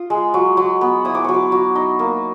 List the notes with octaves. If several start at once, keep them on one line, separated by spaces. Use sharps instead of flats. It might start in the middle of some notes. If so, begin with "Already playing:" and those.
Already playing: F4 D#6
G#3
F#3
F#3
B3
E4 D#6
D6
F#3 C#6
D6
F#3
D#4
A#3